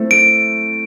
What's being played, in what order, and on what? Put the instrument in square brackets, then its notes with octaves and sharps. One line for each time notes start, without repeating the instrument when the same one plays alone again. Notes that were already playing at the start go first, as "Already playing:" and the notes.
Already playing: [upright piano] A3 C4 E4 A4
[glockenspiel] D7